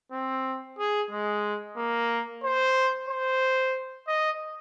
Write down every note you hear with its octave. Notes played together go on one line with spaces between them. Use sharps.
C4
G#4
G#3
A#3
C5
C5
D#5